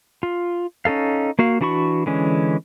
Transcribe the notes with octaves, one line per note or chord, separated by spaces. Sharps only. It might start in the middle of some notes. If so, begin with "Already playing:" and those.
F4
C#4 D#4 A4 F5
A#3 F#4 F5
E3 D4 F#4 B5 C#6
D3 E3 G#3 C#4